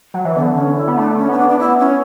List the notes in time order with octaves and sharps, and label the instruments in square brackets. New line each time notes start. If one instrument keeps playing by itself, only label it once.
[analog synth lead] F#3
E3
[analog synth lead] D3 [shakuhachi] B3
[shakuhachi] C#4
E4
[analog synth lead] B3
[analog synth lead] A3 [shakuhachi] D4
[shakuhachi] C#4
[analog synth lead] B3 [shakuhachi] C#4
[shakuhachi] D4
D4
[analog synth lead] B3 [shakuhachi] E4
[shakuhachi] C#4